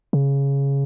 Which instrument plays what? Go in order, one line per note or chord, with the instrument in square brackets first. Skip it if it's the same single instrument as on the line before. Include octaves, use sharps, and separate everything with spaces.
[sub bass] C#3